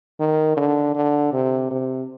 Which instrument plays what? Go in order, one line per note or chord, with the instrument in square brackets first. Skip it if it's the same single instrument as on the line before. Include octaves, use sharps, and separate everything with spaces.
[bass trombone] D#3
D3
D3
C3
C3